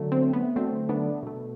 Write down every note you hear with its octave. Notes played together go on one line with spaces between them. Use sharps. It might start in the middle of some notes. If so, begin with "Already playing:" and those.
Already playing: D3 F#3 A3
C4
B3
D3 F#3 A3 C4
B3 D4
B2 A3